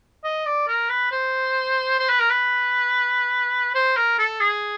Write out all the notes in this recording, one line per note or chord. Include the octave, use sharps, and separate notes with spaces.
D#5
D5
A#4
B4
C5
C5
B4
A#4
B4
C5
A#4
A4
G#4